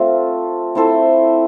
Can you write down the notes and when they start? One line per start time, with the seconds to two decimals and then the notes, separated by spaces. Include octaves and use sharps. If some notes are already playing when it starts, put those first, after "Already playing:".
Already playing: A3 C4 F4
0.75 C4 E4 A4 C5